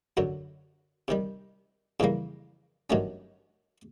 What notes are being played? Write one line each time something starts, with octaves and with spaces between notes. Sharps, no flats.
F#2 D3 F#3
C3 D#3 G3
F2 C#3 E3 G3 A#3
G2 D#3 F#3 A3 C#4